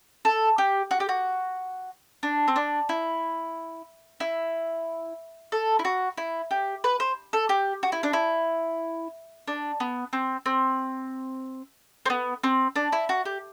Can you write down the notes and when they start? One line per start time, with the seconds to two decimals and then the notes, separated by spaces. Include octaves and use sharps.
0.25 A4
0.58 G4
0.91 F#4
1.00 G4
1.09 F#4
2.23 D4
2.48 C4
2.56 D4
2.89 E4
4.20 E4
5.52 A4
5.79 E4
5.85 F#4
6.18 E4
6.51 G4
6.84 B4
7.00 C5
7.33 A4
7.49 G4
7.83 F#4
7.92 E4
8.03 D4
8.13 E4
9.48 D4
9.80 B3
10.13 C4
10.46 C4
12.06 C4
12.10 B3
12.43 C4
12.76 D4
12.93 E4
13.09 F#4
13.25 G4